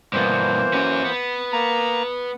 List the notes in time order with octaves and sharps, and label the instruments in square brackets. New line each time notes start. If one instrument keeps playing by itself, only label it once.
[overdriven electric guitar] G2 B2 [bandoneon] E3 A#3 C5
[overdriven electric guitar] C#4 F#4
B3
[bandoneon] A#3 A#5